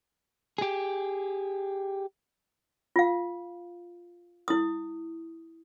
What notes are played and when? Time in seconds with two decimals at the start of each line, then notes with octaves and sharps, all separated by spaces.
0.58 G4 G#4
2.96 F4 F5
4.48 E4 D#6